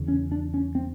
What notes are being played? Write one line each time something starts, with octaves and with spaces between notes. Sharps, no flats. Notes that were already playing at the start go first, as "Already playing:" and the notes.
Already playing: E2 C#3
C#4
D4
C#4
C4